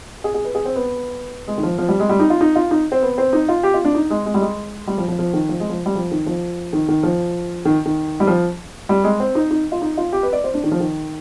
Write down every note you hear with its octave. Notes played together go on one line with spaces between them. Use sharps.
G#4
G#4
B4
G#4
C4
B3
G#3
D#3
F3
F3
G3
G#3
G3
D#4
F4
D#4
F4
D#4
C4
B3
C4
D#4
F4
G4
F4
D4
D#4
G#3
G#3
G3
G#3
G3
F3
F3
F3
D#3
F3
G#3
F3
G3
F3
D#3
F3
D#3
D#3
F3
D#3
D#3
G3
F3
G3
G#3
C4
D#4
D#4
F4
D#4
F4
G4
B4
D5
C5
D4
D#3
F3
D#3